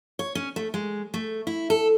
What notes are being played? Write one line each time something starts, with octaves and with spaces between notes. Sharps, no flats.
C#5
C#4
A3
G#3
A3
E4
A4